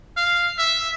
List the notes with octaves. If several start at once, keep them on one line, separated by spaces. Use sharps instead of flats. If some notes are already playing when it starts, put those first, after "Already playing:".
F5
E5